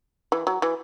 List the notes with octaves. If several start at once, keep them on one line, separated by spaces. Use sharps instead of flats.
E3
F#3
E3